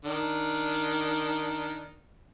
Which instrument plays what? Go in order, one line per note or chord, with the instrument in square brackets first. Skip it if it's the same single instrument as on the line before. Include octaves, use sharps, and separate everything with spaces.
[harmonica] D#3 D4